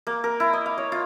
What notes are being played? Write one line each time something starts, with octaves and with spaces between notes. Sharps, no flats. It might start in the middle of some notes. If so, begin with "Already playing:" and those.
A#3
A#4
E4
D#5
F5
C#5
F4